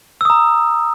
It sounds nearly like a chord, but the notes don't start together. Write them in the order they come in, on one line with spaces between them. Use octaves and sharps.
E6 D#6 A#5